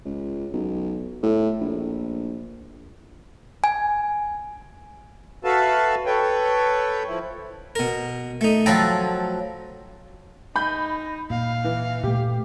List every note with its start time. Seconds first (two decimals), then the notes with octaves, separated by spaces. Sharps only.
0.05 C#2
0.53 B1
1.23 A2
1.61 A#1
3.64 G#5
5.44 F#4 A4 B4 E5 F5 A5
6.06 A4 B4 C#5 G5
7.07 F3 E4
7.76 B2 A#4
8.41 A3 D#4
8.66 F3 F#3 A4 G5 A#5 B5
10.56 D#4 B5 G6
11.30 A#2 F5
11.64 E3
12.03 A#2 A3 G4